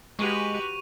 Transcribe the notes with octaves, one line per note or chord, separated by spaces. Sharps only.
G#3 F#4 G4 B4 C#6 D#7 F7